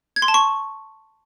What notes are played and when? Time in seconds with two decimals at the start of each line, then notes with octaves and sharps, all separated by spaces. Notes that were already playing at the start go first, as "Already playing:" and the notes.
0.16 G#6
0.22 C6
0.28 A5
0.34 C#6